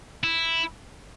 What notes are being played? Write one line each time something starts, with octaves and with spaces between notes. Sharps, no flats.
E4